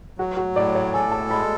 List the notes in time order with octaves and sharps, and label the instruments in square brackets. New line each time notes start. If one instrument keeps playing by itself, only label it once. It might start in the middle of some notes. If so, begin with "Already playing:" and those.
[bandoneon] F#3 [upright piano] F#4
[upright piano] F#4
[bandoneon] A2 [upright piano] D5
[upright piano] C#5
[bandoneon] A4 [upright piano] G#5
[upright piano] A5
[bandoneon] G#3 [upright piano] B5